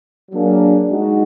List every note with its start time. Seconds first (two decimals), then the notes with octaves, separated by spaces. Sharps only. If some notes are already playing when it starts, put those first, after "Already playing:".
0.31 F#3 A#3 D4 G#4
0.90 G#3 D#4 F#4